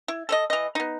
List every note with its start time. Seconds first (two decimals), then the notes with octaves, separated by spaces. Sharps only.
0.08 E4
0.29 A4 C#5 D#5
0.50 E3 D#5
0.75 B3 D#4